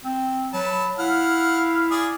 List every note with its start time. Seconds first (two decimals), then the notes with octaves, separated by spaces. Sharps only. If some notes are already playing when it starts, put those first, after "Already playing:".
0.05 C4
0.53 F#3 B4 A5
0.99 E4 F5 F#5 F6
1.91 G#4 D5 D#6